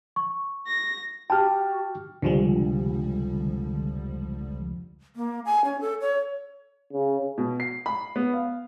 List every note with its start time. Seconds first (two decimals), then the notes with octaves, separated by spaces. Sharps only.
0.16 C#6
0.67 A#6
1.30 F#4 G4 G5 A5 F6
2.22 F1 C#2 D3 F3 G3 G#3
5.16 A#3
5.45 G#5
5.65 C#4
5.81 A4
6.01 C#5
6.93 C#3
7.38 B2
7.60 C7
7.86 B5
8.16 B3
8.33 F5